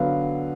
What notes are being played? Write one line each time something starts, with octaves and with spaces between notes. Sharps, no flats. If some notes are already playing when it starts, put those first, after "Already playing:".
Already playing: D3 F#3 B3 F5